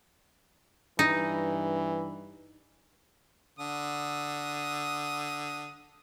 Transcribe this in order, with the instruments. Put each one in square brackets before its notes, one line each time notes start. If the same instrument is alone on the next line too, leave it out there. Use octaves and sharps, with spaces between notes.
[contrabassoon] G2 [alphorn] E3 [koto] D#4
[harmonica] D3 D#6